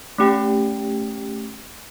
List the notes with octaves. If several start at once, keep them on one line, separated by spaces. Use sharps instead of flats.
A3 C#4 G4 G5